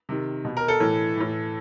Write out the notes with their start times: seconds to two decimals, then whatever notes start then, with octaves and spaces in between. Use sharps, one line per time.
0.09 C3 D#3
0.45 B2
0.57 A#4
0.68 A4
0.80 A2 E3
1.16 A2 E3